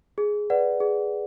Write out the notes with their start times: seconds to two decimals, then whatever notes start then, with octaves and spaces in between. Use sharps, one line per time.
0.18 G#4
0.50 B4 D5 F#5
0.80 G#4